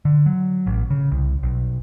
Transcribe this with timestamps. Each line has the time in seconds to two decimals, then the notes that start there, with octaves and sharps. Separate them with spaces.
0.05 D3
0.26 F#3
0.66 A1
0.90 C#3
1.11 C2
1.43 B1